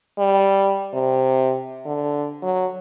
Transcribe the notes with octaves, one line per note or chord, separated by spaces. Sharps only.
G3
C3
D3
F#3